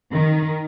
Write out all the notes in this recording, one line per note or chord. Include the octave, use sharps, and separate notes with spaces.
D#3